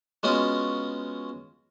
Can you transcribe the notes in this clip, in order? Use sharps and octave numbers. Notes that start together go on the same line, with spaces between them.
G#3 B3 C#4 F4 F#4